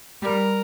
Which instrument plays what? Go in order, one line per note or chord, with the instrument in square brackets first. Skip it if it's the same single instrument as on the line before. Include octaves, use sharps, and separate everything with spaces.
[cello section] G3 [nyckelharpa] A#4